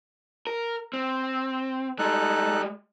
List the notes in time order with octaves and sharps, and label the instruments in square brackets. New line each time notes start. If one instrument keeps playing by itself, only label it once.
[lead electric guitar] A#4
C4
[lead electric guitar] G3 G#3 [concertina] D#4 A4 F#6